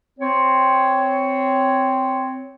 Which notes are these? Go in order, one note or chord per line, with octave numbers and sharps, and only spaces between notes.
C4 C#5